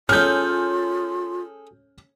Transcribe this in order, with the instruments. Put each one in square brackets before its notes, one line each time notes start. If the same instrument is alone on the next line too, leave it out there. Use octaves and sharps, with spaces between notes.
[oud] C#4 [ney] F4 [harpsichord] G#4 A4 [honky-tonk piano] F6 G6